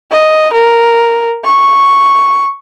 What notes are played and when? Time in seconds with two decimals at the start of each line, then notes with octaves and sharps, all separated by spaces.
0.11 D#5
0.53 A#4
1.44 C#6